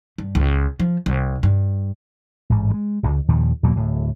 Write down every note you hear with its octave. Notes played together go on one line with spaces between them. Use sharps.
G2
C#2
F3
C2
G2
A1 G#2
F#3 G#3
D1 C#2
D#2 A#2 D#3 F3
E2 B2 F#3 A#3
D1 A2